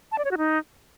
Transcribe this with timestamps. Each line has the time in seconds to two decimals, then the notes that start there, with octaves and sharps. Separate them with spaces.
0.12 A5
0.18 D5
0.25 C#5
0.31 F#4
0.38 D#4